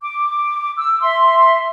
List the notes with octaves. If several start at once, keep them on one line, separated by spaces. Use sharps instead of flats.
D6
E6
E5 C6